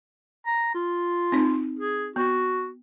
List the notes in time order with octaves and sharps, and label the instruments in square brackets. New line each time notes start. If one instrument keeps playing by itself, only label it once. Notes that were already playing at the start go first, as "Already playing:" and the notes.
[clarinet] A#5
F4
[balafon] C4 D#4
[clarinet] G#4
[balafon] B3 [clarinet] F#4